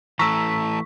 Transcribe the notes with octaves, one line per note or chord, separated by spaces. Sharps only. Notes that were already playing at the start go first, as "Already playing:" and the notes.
E3 A3 A5 A#5 C#6 E6 B6